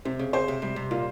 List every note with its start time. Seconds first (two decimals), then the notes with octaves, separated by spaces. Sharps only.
0.05 C3 C4
0.19 C#3
0.33 C#3 C5
0.48 C3
0.62 C3 G3
0.76 C3
0.91 A#2 F4